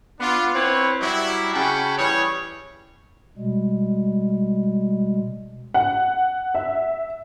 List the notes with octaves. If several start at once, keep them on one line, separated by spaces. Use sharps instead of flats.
B3 D4 F4
C4 E4 B4 C#5
F#3 G3 E4
C#3 C#4 F#4 G5 A5 B5
E3 G3 G#4 C#5
B2 G3 G#3
F#5
E5